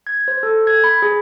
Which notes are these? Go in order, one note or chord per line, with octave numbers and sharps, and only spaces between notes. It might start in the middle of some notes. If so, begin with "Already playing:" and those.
G#6
C5
A4
G#6
B5
G#4